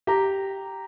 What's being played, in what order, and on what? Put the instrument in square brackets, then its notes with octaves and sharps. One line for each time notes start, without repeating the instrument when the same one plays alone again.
[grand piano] G4 A#5